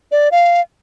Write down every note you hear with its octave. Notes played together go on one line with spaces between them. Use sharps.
D5
F5